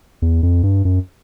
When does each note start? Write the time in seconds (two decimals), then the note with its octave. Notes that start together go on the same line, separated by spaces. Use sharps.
0.22 E2
0.43 F2
0.63 G2
0.85 F#2